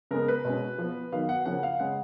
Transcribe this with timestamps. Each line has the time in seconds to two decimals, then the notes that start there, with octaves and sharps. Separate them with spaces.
0.11 C#3 G#3 B3 A#4
0.28 B4
0.45 B2 G#3 C#4
0.78 F3 B3
1.12 D#3 F#3 B3 F5
1.29 F#5
1.45 C#3 F3 A#3 C#4 F#5
1.63 F5
1.79 C#3 G#3 C#4 F#5